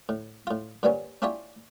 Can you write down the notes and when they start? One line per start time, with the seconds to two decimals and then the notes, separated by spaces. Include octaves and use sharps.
0.09 A2
0.47 A2 F4
0.83 G2 A#2 G3 B3 C#4
1.22 C#4 D4 E4 F4 G4 C#5